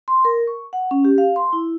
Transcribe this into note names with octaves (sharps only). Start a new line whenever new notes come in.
C6
A#4
C#6
F#5
C#4
G4
F5
C6
E4